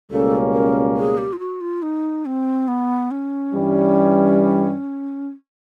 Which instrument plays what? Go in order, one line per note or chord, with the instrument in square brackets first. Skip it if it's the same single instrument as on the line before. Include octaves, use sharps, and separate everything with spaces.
[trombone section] C#2 B2 G3 A#3 C#4 [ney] A4
[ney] A#4
G#4
G4
F4
F#4
F4
D#4
C4
B3
C#4
[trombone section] G2 E3 G3